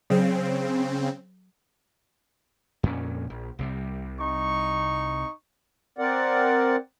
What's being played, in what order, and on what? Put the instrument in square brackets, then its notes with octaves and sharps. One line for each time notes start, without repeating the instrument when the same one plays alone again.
[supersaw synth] C#3 C4 [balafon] F#3 G#4
[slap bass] F2 A#2 C#4
A#1
C2 C3 G3
[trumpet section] D#4 C#6
[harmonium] C4 A#4 D5 F#5